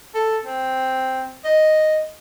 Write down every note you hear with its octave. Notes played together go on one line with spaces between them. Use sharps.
A4
C4
D#5